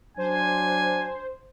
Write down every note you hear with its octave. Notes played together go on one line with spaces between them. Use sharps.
F#3 D4 C5 G#5